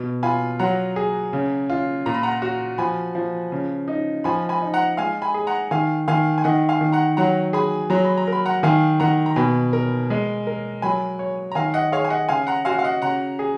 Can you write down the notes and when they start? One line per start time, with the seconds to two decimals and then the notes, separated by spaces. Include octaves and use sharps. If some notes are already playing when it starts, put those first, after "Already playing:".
Already playing: B2
0.23 F4 G#5 B5
0.59 F#3 F#5 A#5
0.96 G#4
1.33 C#3
1.70 F4
2.06 A#2 A#5
2.14 B5
2.23 F#5 A#5
2.42 F#4
2.78 F3 G#5 B5
3.15 F3
3.52 C#3
3.88 D#4
4.24 F3 G#5 B5
4.49 G#5 B5
4.61 D#4
4.74 F#5 A#5
4.97 G#3 F5 G#5
5.22 G#5 B5
5.34 G#4
5.47 F#5 A#5
5.71 D#3 F5 G#5
6.08 D#3 F5 G#5
6.38 G#5
6.44 D#3 D#5 F#5
6.69 F5 G#5
6.81 D#3
6.92 F#5 A#5
7.17 F#3 F#5 A#5
7.53 G#4 G#5 B5
7.90 F#3 A#5
8.05 B5
8.17 A#5
8.28 A#4
8.33 B5
8.46 F#5 A#5
8.63 D#3 F5 G#5
9.00 D#3 F#5 A#5
9.26 A#5
9.36 B2 G#5 B5
9.73 A#4
10.10 G#3
10.47 A#4
10.82 F#3 G#5 B5
11.19 C#5
11.52 A#5
11.55 D#3 F5 G#5
11.74 D#5 F#5
11.92 G#4 C#5 F5
12.04 G#5
12.10 D#5 F#5
12.29 C#3 F5 G#5
12.47 F#5 A#5
12.65 F#4 F5 G#5
12.79 F5
12.84 D#5 F#5
13.02 C#3 F#5 A#5
13.39 G#4